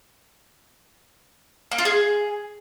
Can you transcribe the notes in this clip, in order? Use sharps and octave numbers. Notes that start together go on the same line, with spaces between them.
A#3
F4
G#4